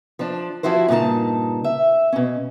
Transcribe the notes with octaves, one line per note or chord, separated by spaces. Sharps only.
F3 D4
F3 C#4 E4 F#4 C5
G2 A#2 C#3 D#4 A5
E5
B2 C#4